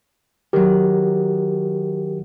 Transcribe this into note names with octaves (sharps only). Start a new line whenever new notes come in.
D#3 F#3 G4 A#4